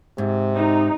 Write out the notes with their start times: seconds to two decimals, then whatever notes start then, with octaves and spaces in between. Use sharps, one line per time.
0.18 G#2 C3
0.55 D#4